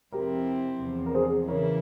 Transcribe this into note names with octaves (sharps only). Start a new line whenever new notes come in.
F2 C3 F3 C4 E4 G4 A#4
E2 C3 F3
A#4
G#4 C5
C#3 E3 A#3 E4 A#4 C#5